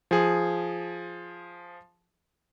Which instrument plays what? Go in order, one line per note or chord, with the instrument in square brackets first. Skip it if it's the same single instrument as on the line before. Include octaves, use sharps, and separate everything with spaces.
[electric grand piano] F3 G#4